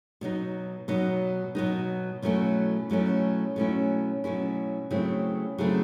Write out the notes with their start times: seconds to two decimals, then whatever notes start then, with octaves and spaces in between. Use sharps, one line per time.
0.21 B2 F#3 B3 D#4
0.88 B2 F#3 B3 D#4
1.55 B2 F#3 B3 D#4
2.22 B2 F#3 A3 C#4 E4
2.90 B2 F#3 A3 C#4 E4
3.56 B2 F#3 A3 C#4 E4
4.24 B2 F#3 A3 C#4 E4
4.90 C#3 F#3 A3 C4 E4
5.58 C#3 F#3 A3 C4 E4